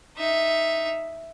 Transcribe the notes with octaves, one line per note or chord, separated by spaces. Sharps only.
D#4 E5